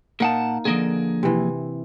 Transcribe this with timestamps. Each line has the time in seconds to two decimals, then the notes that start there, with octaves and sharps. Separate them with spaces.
0.20 A#2 A#3 D#4 F#5 A5
0.65 D3 F3 A#3 G#4 D#5
1.23 C3 E3